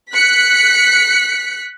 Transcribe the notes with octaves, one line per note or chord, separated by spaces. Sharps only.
F#6 B6 C#7